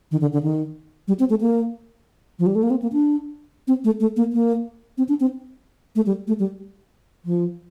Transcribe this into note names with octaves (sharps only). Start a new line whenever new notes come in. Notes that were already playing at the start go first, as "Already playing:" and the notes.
D#3
D3
D3
D#3
G3
C4
A3
A#3
F3
G3
A3
A#3
C4
A#3
D4
C4
A3
A3
A#3
A#3
C4
D4
C4
A3
G3
A3
G3
F3